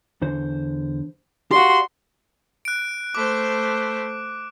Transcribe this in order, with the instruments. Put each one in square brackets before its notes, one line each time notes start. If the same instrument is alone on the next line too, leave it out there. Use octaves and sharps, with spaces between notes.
[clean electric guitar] E2 D3 C5
[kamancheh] F#4 C6 [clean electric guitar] G4 D5 F5
[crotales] F#6 D7
[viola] A3 C5 [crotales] D6